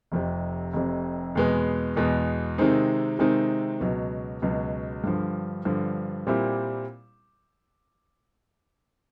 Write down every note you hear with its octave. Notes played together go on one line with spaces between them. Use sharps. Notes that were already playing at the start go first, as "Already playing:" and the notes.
F1 F2 C3
F1 F2 C3
E2 B2 G#3 B3
E2 B2 G#3 B3
C3 D#3 G#3 C4 D#4
C3 D#3 G#3 C4 D#4
C#2 B2 F#3
C#2 B2 F#3
G2 D3 F3
G2 D3 F3
A#2 G3 C4 E4 G4